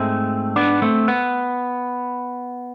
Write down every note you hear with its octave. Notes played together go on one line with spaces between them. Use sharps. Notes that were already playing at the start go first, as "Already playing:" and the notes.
Already playing: G#2 G#3 A3 C4
B3 D4
A3 C4
B3